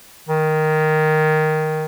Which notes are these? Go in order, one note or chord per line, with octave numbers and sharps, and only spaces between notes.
D#3